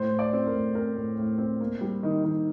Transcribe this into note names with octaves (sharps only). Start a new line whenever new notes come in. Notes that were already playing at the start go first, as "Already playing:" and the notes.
Already playing: A2 C5
A2
D5
C4
A#4
A2
C4 A#4
A2
A2
C4
A#3
G3
D#3
D#3